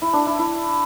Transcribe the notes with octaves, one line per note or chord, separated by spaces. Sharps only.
E4
D4
E4
E4